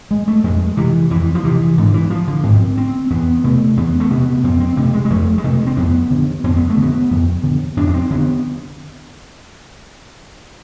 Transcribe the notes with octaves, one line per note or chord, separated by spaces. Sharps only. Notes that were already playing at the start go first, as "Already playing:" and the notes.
G#3
A3
F2 G#3
C3 E3
F2 E3
F3
C3 E3
G#2 D3
E3
F3
D3
G#2 C4
C4
E2 B3
C3 A3
E2 B3
A3
C3 B3
F2 C4
C4
C3 A3
G#3
G#3
F2 A3
G#3
C3 A3
C4
F2 B3
D3
F2 C4
B3
A3
D3
B3
F2
D3
F2 D4
D4
C4
D3 B3